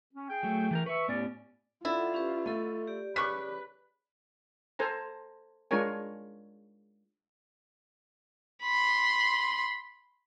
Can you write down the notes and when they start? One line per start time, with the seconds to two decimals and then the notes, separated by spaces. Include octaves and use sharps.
0.13 C#4
0.30 G#4 G5
0.43 F#3 A3
0.71 E3 A4 A#4
0.86 B4 E5 C#6
1.08 D#2 A2 B3 C#4 D5
1.85 D4 E4 F4 A4 F#5
2.14 C#4 G4 B4
2.46 A3 A4 D#5
2.87 G4 D5
3.16 C#3 B4 C#6 D6 F#6 B6
4.79 A4 C5 G#5 A#5
5.71 G#3 D4 F4 A#4 C#5 G#5
8.64 B5 C6